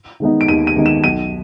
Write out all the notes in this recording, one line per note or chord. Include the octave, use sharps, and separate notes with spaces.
D#3 G#3 B3 D#4
D7
D#2 D#7
D#7
D#3 G#3 B3 D#4
E7
B1 D#7